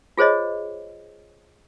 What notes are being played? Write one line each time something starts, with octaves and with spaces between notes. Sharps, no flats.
F4 G#4 C5 C#5 D#5